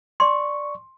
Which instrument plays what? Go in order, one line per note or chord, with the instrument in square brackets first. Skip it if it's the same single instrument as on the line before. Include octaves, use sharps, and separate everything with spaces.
[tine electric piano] D5 C#6 [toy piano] C6